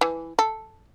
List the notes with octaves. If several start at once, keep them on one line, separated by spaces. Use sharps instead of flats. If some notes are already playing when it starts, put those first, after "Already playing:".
E3
A4